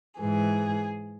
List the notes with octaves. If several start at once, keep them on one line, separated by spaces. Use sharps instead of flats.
G#2 E3 G#4